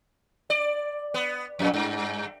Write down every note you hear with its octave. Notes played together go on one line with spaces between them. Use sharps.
D5
B3
F2 A#2
G2